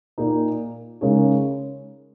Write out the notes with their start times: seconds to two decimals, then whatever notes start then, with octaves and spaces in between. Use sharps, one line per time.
0.18 A#2 A#3 D#4
1.01 C#3 G#3 D#4 A#4 C#5